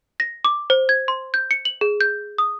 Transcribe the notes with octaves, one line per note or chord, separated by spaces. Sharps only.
A#6
D6
C5
G#6
C6
G6
C#7
F#7
G#4
G6
D#6